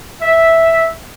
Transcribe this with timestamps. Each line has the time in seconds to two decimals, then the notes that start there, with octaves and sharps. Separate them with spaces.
0.22 E5